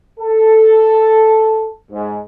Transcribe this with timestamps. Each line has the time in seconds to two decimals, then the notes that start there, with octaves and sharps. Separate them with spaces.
0.19 A4
1.90 G#2